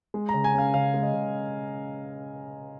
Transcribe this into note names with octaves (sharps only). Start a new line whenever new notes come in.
G#3
A#5
C#3
G#5
C#4 F5
C#3 F5
G#3
D#5
C#3